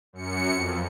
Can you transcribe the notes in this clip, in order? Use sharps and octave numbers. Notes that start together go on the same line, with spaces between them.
F#2 C#7
F2